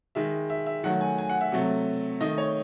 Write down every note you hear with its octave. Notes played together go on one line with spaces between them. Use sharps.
D#3 G#3 E5
E5
E5
D#3 F#3 A3 F#5
G#5
G#5
F#5
E5
C3 F#3 A3
D#3 A3 D#5
C#5